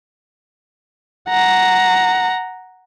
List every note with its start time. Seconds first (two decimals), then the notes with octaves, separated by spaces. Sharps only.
1.29 F#5 A#5